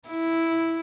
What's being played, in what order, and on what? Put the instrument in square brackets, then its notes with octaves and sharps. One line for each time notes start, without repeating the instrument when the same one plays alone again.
[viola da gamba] E4